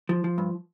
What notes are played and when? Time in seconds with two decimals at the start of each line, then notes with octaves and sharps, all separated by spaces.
0.09 F3
0.24 F3
0.38 G2